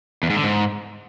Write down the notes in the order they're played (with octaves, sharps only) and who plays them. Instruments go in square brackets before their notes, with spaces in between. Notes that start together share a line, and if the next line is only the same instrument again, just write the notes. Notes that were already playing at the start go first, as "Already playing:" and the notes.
[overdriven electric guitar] E2
G#2
D3
G#2